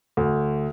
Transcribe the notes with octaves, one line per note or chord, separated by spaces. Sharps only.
D2